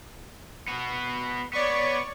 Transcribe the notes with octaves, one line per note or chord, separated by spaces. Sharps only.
B3 F#4
B3 C#5 D5 C#6